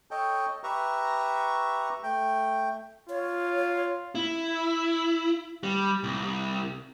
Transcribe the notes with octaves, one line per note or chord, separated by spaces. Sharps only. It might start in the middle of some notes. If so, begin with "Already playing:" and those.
A4 C#5 D#5 G5
G4 B4 E5 A#5 C#6
A3 G5
F4 C#5
E4
G3
C2